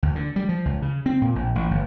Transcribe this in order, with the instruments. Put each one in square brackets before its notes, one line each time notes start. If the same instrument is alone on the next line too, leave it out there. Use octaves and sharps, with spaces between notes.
[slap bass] D2
D3
G3
F3
C#2
C#3
C4
A#2
A#1
A1
G1